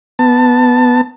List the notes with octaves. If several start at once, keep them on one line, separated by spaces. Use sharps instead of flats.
B3 A5